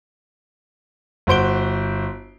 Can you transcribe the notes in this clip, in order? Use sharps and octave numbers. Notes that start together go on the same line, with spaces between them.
G1 F#4 C5 D7 G7